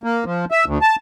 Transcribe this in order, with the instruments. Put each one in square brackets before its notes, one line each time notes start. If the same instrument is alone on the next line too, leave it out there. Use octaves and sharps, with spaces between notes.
[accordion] A#3
F3
E5
D2
A5